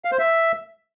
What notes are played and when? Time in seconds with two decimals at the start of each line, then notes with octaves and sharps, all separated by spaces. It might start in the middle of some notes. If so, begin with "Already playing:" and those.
0.05 F5
0.12 C5
0.19 E5